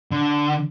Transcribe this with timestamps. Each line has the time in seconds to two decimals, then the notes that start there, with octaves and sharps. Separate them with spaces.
0.11 D3